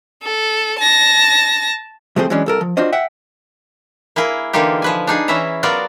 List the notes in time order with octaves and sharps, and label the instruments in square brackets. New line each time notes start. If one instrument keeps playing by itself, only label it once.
[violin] A4
A5 A#6
[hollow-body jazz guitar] C3 F3 A3 C4 G#4 C5
E3 F#3 G#3 C#4 D4
C2 A4 A#4
F3
D4 F4 F#4 C5 D#5
E5 F#5 G5
[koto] A#3 E4 G#4 A#4
D3 E3 A#3 D#4 F4 G4
F3 B4 G#5
D4 D#4 G#4
E3 C#4 E4 E5 A#5
F#3 B3 F4 F#4 A#4 D5